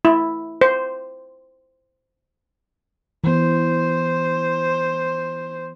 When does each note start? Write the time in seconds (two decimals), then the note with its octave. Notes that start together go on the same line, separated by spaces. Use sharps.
0.05 E4
0.61 C5
3.24 E3 B3 C5